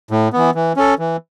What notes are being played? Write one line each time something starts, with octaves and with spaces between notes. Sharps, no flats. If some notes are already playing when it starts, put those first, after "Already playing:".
A2
E3 B3
E3
C#4 A4
E3